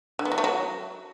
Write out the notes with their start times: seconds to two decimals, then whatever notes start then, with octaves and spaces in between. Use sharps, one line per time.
0.19 D3
0.25 B3
0.32 F#3
0.38 A3
0.44 F#3